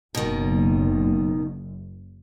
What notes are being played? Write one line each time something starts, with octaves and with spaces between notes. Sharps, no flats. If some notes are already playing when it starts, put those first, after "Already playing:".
F#1 B2 D#3